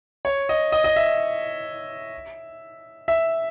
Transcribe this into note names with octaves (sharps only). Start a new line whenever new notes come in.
C#5
D#5
D#5
D#5
E5
E5